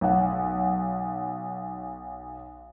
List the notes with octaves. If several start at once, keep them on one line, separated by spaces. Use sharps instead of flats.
B1 F#5